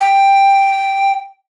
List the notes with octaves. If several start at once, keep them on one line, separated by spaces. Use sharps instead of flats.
G5